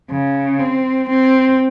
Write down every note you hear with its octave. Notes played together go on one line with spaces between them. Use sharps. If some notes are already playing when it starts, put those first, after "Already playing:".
C#3
C4
C4